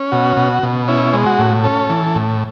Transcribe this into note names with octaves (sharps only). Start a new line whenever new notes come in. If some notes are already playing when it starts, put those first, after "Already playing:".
Already playing: C#4
B2 F#4
B2
B2
C#4 E4
G#3
F#4
A2
C#4 A4
E3
A2